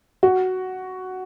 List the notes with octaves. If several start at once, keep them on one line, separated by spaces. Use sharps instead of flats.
F#4